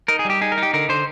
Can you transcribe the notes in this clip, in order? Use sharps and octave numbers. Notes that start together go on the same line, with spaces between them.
D#4 A#4
G#4
G3 G4
D#4 G#4
A#4
D#4 G4
D3 A#4
D3 C5